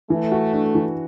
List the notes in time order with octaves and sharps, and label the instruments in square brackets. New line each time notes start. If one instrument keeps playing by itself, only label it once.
[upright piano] E3 [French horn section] A3
[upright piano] F#4
D4
E3